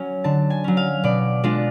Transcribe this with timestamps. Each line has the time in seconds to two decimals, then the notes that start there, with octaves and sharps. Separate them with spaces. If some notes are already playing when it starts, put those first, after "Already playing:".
Already playing: F#3 C#4 G#5
0.24 D3 A5
0.50 G#5
0.64 F#3 C#4
0.77 F5
1.04 B2 D5
1.44 G#3 D4 F4